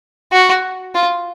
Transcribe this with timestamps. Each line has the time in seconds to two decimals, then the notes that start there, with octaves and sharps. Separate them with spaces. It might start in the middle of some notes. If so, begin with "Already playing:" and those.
0.32 F#4
0.95 F4